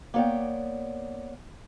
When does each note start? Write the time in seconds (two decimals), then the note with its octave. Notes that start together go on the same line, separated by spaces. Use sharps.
0.14 A#3 B3 C#5 D5 G5